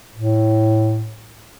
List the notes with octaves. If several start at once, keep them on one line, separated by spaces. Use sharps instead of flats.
A2